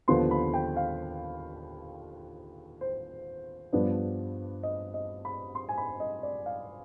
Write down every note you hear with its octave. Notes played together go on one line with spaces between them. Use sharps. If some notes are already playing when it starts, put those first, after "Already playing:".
D#2 D3 F3 B3 C6
B5
G5
F5
C5
G2 F3 B3 D4
D#5
D#5
B5
C6
G#5
B5
D#5
D5
F5